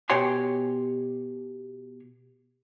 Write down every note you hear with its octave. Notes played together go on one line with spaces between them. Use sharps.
B2 G4 C#5 G5 G#5 C6